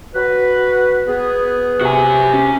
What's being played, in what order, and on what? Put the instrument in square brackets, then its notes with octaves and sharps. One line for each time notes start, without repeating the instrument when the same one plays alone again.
[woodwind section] F#4 B4
B3 G#4
[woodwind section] C3 [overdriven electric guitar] F#4 G#5
[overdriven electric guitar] C#4